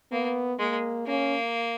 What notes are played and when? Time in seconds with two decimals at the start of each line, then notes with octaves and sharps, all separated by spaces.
0.12 A#3 B3
0.59 G#3 A#3
1.07 A#3 C#4